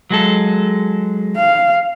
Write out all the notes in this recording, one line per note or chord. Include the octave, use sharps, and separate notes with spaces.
F#3 G#3 A4
F5